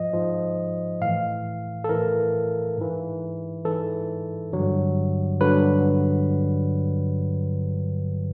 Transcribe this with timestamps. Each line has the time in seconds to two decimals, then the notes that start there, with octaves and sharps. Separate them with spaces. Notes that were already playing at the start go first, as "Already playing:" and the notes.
Already playing: G#2 F3 D#5
0.13 G#2 F3
1.01 A2 E3 F5
1.84 A4
1.89 A2 E3 A#4
2.78 G#2 E3
3.65 G#2 E3 A4
4.53 G2 D3 F#3
5.40 G2 D3 F#3 B4